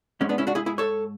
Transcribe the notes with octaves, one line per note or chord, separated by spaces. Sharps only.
G#2 G#3 C#4
B3 D4
C#4 E4
D4 F#4
E4 G#4
E4 G#4
A4 C#5